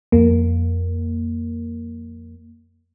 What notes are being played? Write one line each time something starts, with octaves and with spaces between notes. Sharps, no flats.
F2 A#3